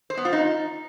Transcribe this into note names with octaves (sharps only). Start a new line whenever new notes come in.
C5
B3
F4
D#4